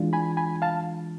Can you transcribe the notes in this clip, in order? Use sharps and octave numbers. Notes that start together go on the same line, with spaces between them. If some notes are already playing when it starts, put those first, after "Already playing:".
Already playing: E3 G#3 D4 F4
G#5 B5
G#5 B5
F5 A5